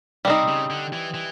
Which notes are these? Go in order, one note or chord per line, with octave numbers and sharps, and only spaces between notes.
C3 G3 C4 D#4
C#3
D3
E3
E3